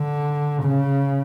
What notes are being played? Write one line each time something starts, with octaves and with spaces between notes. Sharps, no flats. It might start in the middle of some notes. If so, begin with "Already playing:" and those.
Already playing: D3
C#3